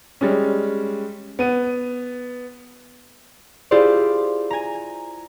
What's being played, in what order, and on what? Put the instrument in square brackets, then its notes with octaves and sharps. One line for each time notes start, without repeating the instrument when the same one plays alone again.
[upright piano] G3 G#3 C#4
B3 D#7
[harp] E4 F4 G4 G#4 C5 D5
G#5 A#5